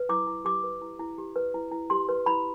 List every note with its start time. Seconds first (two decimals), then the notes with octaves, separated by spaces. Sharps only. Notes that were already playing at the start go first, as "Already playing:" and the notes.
Already playing: B4
0.09 E4 D6
0.27 E4
0.45 G4 D6
0.63 B4
0.82 E4
0.99 E4
1.18 G4
1.36 B4
1.54 E4
1.72 E4
1.90 G4 C6
2.09 B4
2.26 E4 B5